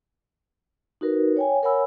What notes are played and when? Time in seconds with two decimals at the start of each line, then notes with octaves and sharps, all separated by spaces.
1.01 D#4 F#4 A#4 B4
1.37 C#5 G5 G#5
1.63 A#4 C#5 F#5 G#5 B5 E6